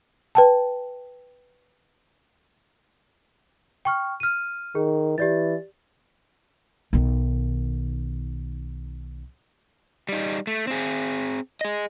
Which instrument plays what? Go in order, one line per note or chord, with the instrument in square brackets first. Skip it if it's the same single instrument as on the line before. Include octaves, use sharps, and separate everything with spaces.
[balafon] B4 G5 A5
[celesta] G5 C#6 F6
F6 D#7
[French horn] D#3 [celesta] G#4
[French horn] E3 [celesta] G4 D5 A6
[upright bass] B1 D#3
[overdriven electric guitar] G3 D#4
A3
C4 G#4
G#4 D#5